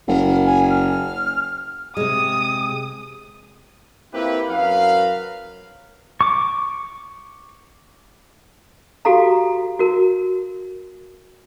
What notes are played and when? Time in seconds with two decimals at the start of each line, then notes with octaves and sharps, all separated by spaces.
0.08 F#1 A#4
0.46 G#5
0.70 F6
1.97 C3 G#3 D#6
4.13 A#3 C4 E4 F4 G4 B4
4.49 F#2 F#3 A#4 B4 F5
6.21 C#6 D6
9.05 F#4 G4 A4 F5 A#5
9.79 F#4 A#4